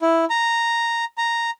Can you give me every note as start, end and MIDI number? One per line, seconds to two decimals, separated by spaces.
0.01 0.25 64
0.30 1.05 82
1.18 1.50 82